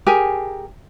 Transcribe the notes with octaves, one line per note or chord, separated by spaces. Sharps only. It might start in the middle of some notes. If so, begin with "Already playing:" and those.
G4 G#4 A#4 G#5